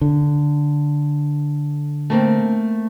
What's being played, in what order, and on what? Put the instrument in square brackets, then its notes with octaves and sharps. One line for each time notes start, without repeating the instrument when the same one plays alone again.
[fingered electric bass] D3
[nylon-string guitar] A3 A#3 C4